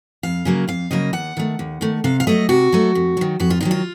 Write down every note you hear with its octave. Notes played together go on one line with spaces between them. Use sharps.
F2 F5
C#3 F#3 A#3
F2 F5
C#3 F#3 A#3 D#5
D#2 F#5
D#3 A3
D#2
D#3 A3
C3 F5
F5
F#3 A3 D#5
C3 F#4
F#3 A3
F2
D#3 F#3
F2 F#4
F4
D#3 F#3 D#4
F4